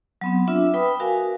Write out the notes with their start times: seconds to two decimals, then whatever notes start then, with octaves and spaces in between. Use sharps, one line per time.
0.21 F#3 B3 C4
0.48 D4 F4 E5 D6 E6
0.74 B4 G5 B5 D#6
1.00 F#4 A#4 F5 G#5